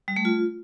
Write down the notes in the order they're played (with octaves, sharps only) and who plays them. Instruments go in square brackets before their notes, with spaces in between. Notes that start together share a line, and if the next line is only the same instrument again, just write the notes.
[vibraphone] G3
A3
F4